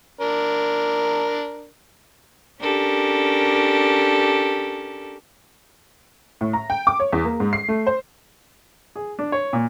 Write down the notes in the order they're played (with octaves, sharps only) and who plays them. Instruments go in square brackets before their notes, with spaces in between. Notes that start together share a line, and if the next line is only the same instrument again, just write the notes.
[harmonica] D4 A#4
[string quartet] C#4 D4 G4 A4 A#4
[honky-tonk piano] A2
A#5
G5
D6
C#5
E2
A#3
G#2
C7
A3
C5
[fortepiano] G#4
D4
C#5
A#2